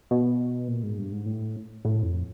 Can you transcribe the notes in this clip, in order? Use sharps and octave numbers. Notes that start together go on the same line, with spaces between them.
B2
A#2
G#2
G2
G#2
A2
A2
F2